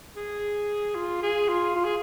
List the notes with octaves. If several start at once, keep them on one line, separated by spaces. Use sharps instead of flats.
G#4
F4
G#4
F4
F4
G#4